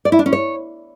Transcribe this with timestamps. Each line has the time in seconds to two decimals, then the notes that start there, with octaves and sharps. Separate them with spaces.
0.05 D5
0.12 E4
0.19 D4
0.26 C#4
0.33 C#5